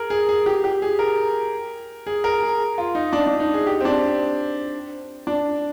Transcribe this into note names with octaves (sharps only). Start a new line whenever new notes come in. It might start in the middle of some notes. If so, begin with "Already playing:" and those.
Already playing: G#4 A#4
G#4
G#4
G4
G4
G#4
A#4
G#4
A#4
G#4
F4
D#4
D4
D4
D#4
G#4
G4
C4
D4
D4